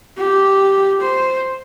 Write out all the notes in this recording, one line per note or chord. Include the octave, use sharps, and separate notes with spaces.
G4
C5